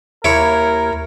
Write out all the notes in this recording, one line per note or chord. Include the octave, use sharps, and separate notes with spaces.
D#2 E4 A#4 C#5